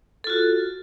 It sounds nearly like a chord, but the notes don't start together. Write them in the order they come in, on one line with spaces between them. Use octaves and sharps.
A4 F4 F#4